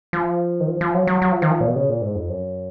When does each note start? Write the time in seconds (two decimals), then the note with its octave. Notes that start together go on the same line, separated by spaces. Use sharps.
0.13 F3
0.60 D#3
0.67 F3
0.81 F3
0.94 F#3
1.07 F#3
1.22 F#3
1.32 F3
1.42 D#3
1.51 F3
1.60 A#2
1.67 B2
1.76 C#3
1.89 A#2
2.02 G#2
2.15 F2
2.29 F#2